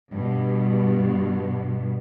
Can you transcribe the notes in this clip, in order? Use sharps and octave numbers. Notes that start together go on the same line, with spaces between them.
G2 B2